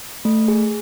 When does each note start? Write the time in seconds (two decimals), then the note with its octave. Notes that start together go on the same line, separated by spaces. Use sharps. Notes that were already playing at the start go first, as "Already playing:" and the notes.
0.25 A3
0.48 G#4